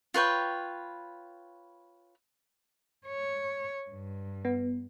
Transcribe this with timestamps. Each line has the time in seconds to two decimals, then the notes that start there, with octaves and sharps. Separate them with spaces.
0.14 F4 B4 C#5 G5
3.07 C#5
3.90 G2
4.45 B3